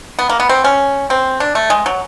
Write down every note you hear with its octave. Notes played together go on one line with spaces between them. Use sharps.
B3
A#3
B3
C4
C#4
C4
D4
A3
G#3
F#3